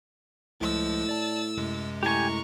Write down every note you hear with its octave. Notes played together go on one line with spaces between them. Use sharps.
C#2 A2 F3 G#3 E6 A6
D5 A5
F#2 C3 G#3
A2 G4 G#5 A#5 C#6